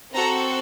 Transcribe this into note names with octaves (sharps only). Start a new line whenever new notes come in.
C4 F#4 A4 A#5